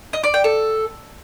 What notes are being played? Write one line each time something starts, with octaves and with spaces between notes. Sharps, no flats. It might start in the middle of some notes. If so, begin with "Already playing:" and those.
D#5
D5
G5
A4